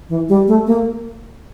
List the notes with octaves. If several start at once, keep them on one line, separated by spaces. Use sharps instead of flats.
E3
G3
A3
A#3